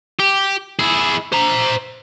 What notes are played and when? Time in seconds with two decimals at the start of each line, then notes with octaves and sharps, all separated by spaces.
0.20 G4
0.79 E4 G#4
1.32 C5 A#5